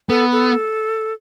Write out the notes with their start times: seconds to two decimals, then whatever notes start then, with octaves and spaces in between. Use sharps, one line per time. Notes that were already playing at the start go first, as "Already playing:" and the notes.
0.09 B3 A4
0.32 A4